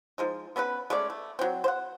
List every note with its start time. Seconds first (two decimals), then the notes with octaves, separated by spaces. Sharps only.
0.18 F3 G#3 D#4
0.56 B3 C#4 A4 B4
0.90 G#3 A3 C#4 D5
1.10 A3
1.39 F#3 C4
1.64 C5 F#5